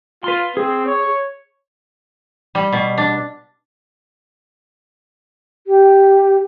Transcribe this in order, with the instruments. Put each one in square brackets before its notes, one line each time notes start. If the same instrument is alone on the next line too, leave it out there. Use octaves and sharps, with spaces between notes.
[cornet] F4 [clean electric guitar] B4 C6
[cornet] C4 [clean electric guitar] G#4
[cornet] C#5
[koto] G3
B2
D4
[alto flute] G4